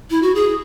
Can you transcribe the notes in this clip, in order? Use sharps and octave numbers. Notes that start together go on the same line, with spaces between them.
E4
F#4
G#4